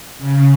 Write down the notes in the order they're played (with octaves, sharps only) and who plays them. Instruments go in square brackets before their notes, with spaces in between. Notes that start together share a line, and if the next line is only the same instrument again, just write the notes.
[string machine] C#3